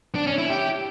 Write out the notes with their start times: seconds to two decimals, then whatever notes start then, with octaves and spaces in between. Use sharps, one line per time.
0.15 D4
0.27 C#4
0.38 E4
0.50 G4